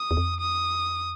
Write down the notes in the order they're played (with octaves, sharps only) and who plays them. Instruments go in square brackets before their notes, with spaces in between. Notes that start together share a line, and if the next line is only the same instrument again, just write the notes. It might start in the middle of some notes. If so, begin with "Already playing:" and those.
Already playing: [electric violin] D#6
[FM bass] E2
F2
[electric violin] D#6